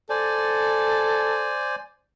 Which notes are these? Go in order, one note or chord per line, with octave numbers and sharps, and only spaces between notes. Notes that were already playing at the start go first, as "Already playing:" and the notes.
A4 C5 D5 G#5